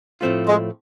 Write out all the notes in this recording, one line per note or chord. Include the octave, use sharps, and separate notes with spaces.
A2 F3 A3 C4 F4
G#3